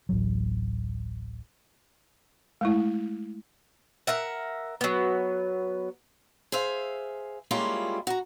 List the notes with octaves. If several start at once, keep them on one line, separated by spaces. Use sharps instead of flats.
D1 A1 F#3
G#3 A3 E4
A#4 E5 F#5
F#3 B3
G#4 C5 E5 F5
G3 G#3 A#3 C#4 E4 F4
F#4 A#5